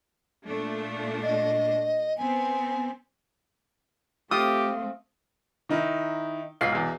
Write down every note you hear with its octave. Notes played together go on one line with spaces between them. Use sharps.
A#2 A3 D4
D#5
B3 C4 G#5
A3 C4 F4 G4 D#6
D#3 D#4 E4
B1 G#2 F4 C7
B1 E2